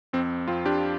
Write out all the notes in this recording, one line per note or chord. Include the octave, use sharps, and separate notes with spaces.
F2 C4
F2 C4 F4
D4 G4